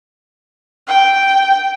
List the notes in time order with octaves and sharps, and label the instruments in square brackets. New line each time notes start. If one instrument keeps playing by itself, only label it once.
[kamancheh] G5